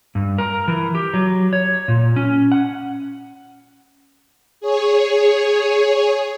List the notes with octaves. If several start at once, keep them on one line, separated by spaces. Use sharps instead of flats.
G2
A#4
E3
G4
F#3
C#5
A#2
C#4
F#5
G#4 C#5